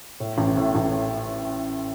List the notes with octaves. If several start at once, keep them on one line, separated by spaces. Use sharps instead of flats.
A2
A1
A2
A1